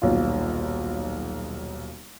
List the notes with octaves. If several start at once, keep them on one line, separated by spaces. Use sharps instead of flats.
D#1 B1 F4